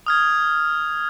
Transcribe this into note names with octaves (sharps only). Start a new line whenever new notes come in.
D#6 F6 G#6